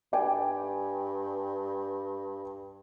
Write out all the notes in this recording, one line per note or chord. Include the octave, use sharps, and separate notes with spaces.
G2 D5 G5 G#5